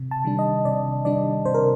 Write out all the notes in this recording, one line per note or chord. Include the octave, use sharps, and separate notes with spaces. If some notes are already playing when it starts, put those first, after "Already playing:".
Already playing: C3
A5
D#3 G3 D4
D#5
C3 D5
D#3 G3 D4 D5
C3 C5
A#4